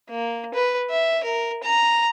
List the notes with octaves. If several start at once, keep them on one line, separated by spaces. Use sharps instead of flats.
A#3
B4
E5
A#4
A#5